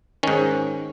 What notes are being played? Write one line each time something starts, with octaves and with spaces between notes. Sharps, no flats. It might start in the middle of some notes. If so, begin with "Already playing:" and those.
G#2 D#3 C#4